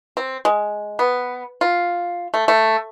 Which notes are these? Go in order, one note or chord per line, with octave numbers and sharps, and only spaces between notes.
C4
G#3
B3
F4
A3
A3